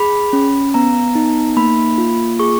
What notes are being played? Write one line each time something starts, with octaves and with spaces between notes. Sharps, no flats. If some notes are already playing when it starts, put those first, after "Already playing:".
Already playing: G#4 B5
C#4
B3 A#5
D#4
A#3 B5
F4
G#4 C#6